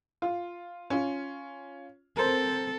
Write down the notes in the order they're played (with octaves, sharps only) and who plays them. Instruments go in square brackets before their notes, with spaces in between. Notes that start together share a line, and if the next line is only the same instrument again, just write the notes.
[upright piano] F4
C#4 F4
[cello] C4 A4 [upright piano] A#4 C5